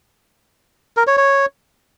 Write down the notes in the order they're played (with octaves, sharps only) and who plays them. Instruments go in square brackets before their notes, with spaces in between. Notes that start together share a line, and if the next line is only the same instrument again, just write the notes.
[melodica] A#4
C#5
C#5